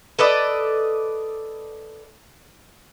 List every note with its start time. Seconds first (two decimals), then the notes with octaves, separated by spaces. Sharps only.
0.19 A4 B4 D5 D#5